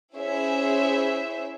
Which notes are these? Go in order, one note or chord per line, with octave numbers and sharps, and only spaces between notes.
C#4 E4 G#4 C5 E5